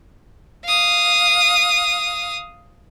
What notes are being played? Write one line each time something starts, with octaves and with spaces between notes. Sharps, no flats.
F5 D#6